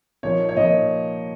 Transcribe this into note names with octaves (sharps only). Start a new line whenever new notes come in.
A#2 F3 A#3 D#4 C#5
C#5
A#2 F3 A#3 D#4 D#5